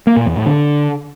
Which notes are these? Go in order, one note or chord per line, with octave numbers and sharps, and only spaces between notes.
A#3
A#2
E2
A2
D3